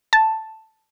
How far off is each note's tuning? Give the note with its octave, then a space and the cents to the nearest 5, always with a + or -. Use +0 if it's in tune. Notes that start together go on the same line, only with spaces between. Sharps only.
A5 +5